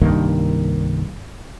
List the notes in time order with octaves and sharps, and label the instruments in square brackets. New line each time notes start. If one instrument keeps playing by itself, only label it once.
[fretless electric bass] C2 G2 D#3 A#3